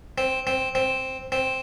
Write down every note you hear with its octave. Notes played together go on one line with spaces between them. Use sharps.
C4
C4
C4
C4